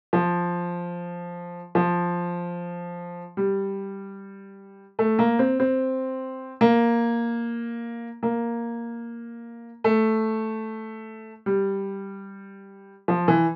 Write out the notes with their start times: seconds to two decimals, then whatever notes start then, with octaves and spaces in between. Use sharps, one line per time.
0.13 F3
1.75 F3
3.37 G3
4.99 A3
5.19 A#3
5.39 C4
5.60 C4
6.61 A#3
8.23 A#3
9.84 A3
11.46 G3
13.08 F3
13.28 E3